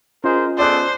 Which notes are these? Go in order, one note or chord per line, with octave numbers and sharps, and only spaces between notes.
C#4 F4 G#4 A#4 C5 D#5
B3 G#4 A4 C5 D5 D6 F#6